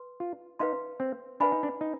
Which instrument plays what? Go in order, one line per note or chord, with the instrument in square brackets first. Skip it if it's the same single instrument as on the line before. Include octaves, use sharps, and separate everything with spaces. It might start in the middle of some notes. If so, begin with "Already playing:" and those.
Already playing: [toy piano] B4 C6
[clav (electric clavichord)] F4
[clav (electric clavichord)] D#4 [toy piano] B4 F5 C6
[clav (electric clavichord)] C4
[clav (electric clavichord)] D4 [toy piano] B4 F5 G#5 B5
[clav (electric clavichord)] D#4
D4
D#4